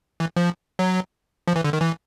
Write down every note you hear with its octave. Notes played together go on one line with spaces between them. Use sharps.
E3
F3
F#3
F3
E3
D3
D#3
E3